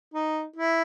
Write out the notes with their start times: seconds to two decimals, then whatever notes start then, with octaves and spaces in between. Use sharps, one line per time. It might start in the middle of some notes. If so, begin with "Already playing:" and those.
0.14 D#4
0.56 E4